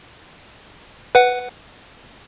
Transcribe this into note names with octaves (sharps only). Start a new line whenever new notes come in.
B4 F#5